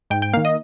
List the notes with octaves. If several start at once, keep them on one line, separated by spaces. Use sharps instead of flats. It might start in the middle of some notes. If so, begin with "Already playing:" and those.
G#2 G5
G5
D#3 A#3 F5
D#5